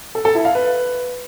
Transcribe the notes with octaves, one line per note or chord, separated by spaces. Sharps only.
A4
A4
E4
F5
B4